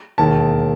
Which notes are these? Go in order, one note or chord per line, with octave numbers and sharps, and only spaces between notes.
E1 D#2 D#3 A5